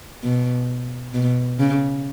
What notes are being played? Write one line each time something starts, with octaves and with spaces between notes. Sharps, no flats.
B2
B2
C#3